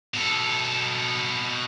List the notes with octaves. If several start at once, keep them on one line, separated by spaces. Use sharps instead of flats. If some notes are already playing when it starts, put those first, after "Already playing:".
B2 A4